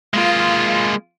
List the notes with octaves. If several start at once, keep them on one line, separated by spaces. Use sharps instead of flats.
G#3 A#3 F4